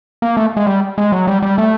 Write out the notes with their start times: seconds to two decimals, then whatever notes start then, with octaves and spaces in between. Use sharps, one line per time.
0.22 A#3
0.37 A3
0.57 G#3
0.67 G3
0.98 G#3
1.12 F#3
1.27 G3
1.42 G3
1.58 A3